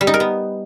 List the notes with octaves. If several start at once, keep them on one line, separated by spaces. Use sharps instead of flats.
G3
D#4
A#4
B3